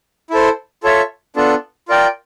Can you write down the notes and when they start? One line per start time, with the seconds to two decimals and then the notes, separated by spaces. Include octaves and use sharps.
0.30 E4 A4 C5
0.84 F4 A4 C#5 E5
1.36 B3 D4 F4 A4
1.89 F4 A#4 D5 G5